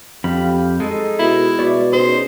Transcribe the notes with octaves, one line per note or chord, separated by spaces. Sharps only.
F2 G4 F5 B5
G#3 D#4 A4
B2 E4
B2 D5 C#6 D6
C#4 D#4 G#4 C5